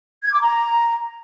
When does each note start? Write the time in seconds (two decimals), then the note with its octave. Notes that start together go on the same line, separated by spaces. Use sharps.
0.23 G#6
0.33 D6
0.42 A#5